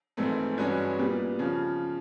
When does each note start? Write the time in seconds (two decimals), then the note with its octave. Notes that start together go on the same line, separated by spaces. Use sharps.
0.17 A#1 G#2 E3 A3 C4
0.58 G2 E3 G#3 C#4 F#4
0.98 A#2 G3 B3
1.39 C#3 F3